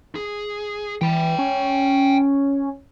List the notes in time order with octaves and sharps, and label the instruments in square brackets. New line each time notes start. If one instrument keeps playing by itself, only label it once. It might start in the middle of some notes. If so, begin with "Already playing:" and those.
[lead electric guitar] G#4
[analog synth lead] E3 [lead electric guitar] G5 B5
[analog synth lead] C#4